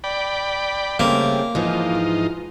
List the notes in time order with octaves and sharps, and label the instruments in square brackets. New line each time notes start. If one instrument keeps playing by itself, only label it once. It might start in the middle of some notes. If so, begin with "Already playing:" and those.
[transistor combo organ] D5 G5 B5
[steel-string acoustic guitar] C#3 A3 C4 [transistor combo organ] G3 [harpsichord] A#3
[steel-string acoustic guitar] G#2 E3 F3 [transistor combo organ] D#4 F4